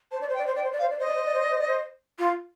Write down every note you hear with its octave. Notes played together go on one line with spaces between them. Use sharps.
C5 A5
D5
C5
G5
D5
C5
D5 G5
C5
D5
F5
C5
D5
C5 D#5
D5
C5
D5
C5
D5
C5
D5
C5
F4